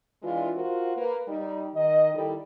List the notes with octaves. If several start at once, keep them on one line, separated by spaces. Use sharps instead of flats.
E3 G#3 D4 F4
F4 F#4 A#4 C5
A#3 B4
G3 D#4
D#3 D#5
D#3 G3 E4 G4 A4